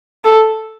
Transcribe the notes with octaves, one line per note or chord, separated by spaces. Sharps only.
A4